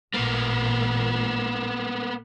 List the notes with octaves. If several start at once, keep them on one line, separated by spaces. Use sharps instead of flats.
A1 A#2 A#3 B3